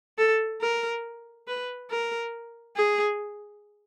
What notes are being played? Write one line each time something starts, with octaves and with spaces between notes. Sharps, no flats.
A4
A#4
B4
A#4
G#4